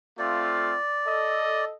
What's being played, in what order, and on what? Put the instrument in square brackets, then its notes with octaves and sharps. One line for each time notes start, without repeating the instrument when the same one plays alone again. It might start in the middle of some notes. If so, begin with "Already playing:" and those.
[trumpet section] A3 C4 F4 [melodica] D5
[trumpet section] A4 D#5